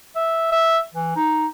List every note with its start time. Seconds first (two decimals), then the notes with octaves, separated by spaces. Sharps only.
0.16 E5
0.52 E5
0.94 E3
1.16 D#4